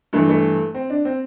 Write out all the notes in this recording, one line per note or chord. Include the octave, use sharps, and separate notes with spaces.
G2 E3 A3
A3
C4
D4
C4